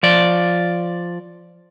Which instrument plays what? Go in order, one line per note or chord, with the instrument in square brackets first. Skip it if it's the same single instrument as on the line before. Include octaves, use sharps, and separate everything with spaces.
[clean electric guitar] F3 D5